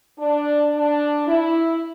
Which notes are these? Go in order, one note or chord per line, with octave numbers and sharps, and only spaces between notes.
D4
D4
E4